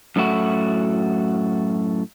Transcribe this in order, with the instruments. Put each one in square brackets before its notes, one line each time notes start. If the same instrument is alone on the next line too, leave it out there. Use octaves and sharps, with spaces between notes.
[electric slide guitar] F#2 A2 A3 E4 F#4